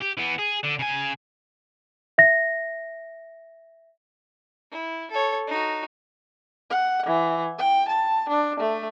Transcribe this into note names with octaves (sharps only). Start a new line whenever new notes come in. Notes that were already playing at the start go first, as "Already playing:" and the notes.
G4
E3 B3
G#4
D3
C#3 G#5
E5 A#6
E4
A4 C#5
D#4 F#4
F#5
E3
G5
A5
D4
A3